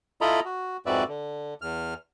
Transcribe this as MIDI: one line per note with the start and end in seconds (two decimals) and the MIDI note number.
0.21 0.40 64
0.21 0.40 65
0.21 0.40 69
0.21 0.40 75
0.21 0.40 82
0.21 0.40 83
0.45 0.77 66
0.86 1.04 41
0.86 1.04 44
0.86 1.04 66
0.86 1.04 71
0.86 1.04 74
0.86 1.04 76
1.08 1.54 50
1.62 1.94 40
1.62 1.94 89